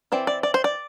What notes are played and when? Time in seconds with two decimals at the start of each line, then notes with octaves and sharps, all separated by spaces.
0.12 E3 C4 E4 D5
0.27 D5
0.43 D5
0.54 C5
0.64 D5